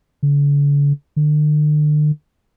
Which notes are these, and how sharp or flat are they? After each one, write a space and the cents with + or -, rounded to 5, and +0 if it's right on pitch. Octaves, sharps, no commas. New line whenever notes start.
D3 -45
D3 +40